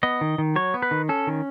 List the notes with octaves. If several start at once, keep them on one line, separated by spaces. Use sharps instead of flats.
B3 D#5
D#3
D#3
F#3 C#5
B3
B4
D#3
C#4 A4
D#3